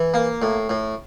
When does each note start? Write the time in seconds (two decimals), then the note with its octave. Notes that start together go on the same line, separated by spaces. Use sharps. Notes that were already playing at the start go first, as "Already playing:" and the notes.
Already playing: E3
0.14 A#3
0.42 A2
0.69 A2